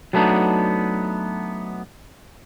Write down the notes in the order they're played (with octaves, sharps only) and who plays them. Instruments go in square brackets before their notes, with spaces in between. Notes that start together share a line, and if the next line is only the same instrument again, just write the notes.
[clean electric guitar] F#3 G3 A3 B3 D4 D#4